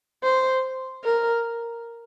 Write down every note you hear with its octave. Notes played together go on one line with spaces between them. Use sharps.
C5
A#4